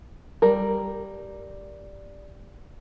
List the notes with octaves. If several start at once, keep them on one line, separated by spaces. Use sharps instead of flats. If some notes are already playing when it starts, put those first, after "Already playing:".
G3 A#4